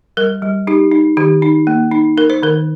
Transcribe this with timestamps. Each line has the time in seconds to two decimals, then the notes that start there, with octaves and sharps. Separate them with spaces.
0.17 G3 A#4
0.42 G3
0.67 D#4 G4
0.92 D#4
1.17 D#3 G4
1.42 D#4
1.67 A#3
1.92 D#4
2.17 D#4 A#4
2.30 C5
2.43 D#3 A#4